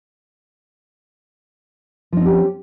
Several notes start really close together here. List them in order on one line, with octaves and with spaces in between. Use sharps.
F3 D#4 C4 G4 C#4